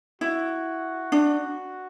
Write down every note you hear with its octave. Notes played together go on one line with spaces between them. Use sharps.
E4 F#4
D4